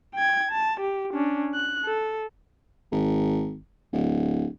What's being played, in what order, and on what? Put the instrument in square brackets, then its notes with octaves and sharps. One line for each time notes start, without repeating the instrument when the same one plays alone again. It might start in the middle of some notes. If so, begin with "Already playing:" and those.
[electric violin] G5 G#6
A5
G4
C#4 D4
F#6
A4
[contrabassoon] G#1
D1